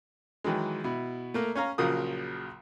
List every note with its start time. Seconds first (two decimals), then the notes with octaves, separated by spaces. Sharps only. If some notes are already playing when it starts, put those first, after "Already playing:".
0.44 D#3 E3 F#3 G#3
0.84 B2 E4
1.34 A3 A#3 A#4
1.55 C#4 C#5 F5 A#5
1.78 A#1 C#3 F3 F#3 A#4 D#6